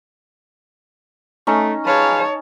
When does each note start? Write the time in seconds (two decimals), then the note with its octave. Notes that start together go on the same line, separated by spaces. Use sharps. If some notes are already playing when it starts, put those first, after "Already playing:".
1.47 A3 C#4 D#4
1.86 G#4 B4 C#5 F5 A5